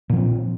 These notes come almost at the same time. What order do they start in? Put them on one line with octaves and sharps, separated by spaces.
A#2 F3 C4